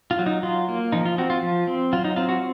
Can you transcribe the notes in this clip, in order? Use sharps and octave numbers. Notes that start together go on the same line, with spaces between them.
F4
F#3
D#4
F#3 F4
A#3
F3 D#4
F4
C4 F#4
F4
F3
C4
F#3 F4
D#4
C4 F4
F#4